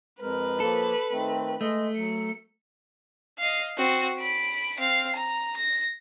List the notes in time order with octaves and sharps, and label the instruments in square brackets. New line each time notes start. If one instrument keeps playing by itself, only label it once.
[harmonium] F2 G#3 A#4 [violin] B4
[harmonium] F3 A#3 [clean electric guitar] A4
[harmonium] D#3 A3 C4
[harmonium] G#3 D#5 [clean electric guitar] A3
[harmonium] F#3 [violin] C#7
[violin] D#5 F5
C4 F#4
B5 D7
C4 F5
A#5
A#6